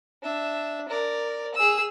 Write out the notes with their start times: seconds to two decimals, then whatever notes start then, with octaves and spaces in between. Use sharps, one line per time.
0.23 D4 E5
0.88 A#4 D5
1.55 G#4 E6